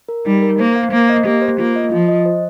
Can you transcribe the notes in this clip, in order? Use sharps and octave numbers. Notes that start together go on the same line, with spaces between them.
A#4
G3 D#4
A#4
A#3 C5
F5
A#3 C5
D#5
A#3 G4
C5
A#3 F4
D#5
F3 F4
D#5
C5